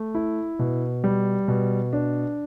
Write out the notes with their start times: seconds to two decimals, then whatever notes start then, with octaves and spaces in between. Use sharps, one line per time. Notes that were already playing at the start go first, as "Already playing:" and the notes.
Already playing: A3
0.15 E4
0.59 B2
1.04 G3
1.48 B2
1.93 D4